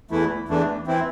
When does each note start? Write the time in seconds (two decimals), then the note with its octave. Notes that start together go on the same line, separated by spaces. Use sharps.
0.10 E2 E3 A3 E4
0.48 E2 E3 A3 D4
0.87 E3 C4 E4